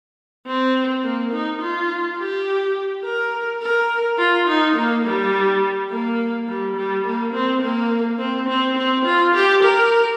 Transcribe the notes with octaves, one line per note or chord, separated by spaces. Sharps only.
C4
A#3
D#4
F4
G4
A#4
A#4
F4
D#4
A#3
G3
A#3
G3
G3
A#3
C4
A#3
C4
C4
C4
F4
G4
A#4